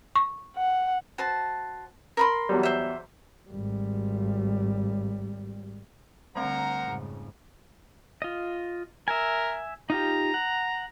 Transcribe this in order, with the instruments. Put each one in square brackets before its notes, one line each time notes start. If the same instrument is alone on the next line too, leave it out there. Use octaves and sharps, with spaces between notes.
[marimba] C#6
[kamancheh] F#5
[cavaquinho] F#4 C5 A5
A#4 B5 C6
[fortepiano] E2 F#3 G3
[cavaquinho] C5 E5
[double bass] G#1 G3
[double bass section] D3 [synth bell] G3 A3 C4 [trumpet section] A#4 C5 A#5 [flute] F#5
[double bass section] F2 G#2 C#3
[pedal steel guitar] F4 D#5
[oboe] A#4 [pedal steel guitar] E5 G#5
[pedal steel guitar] D#4 F4 G4 [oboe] A#5
[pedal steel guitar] F#5